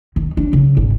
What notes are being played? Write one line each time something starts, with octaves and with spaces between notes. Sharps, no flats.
D#3
D4
C#3
G#1